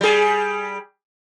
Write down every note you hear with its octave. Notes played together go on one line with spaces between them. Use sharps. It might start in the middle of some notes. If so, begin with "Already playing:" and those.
G3 G#4